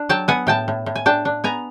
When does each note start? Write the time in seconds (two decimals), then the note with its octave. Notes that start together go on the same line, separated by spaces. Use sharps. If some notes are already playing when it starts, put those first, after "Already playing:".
Already playing: D4
0.09 F#3 G5 A5
0.28 B3 F#5 G#5
0.47 A2 G5 A5
0.68 A2
0.86 A2
0.96 G#5
1.06 D4 G5 A5
1.25 D4
1.44 B3 G#5 A#5